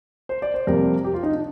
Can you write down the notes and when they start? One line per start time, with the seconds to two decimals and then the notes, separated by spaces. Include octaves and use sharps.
0.29 C5
0.42 D5
0.54 C5
0.67 F2 C3 G3 A#3 A#4
1.04 G4
1.14 F4
1.23 D#4
1.33 D4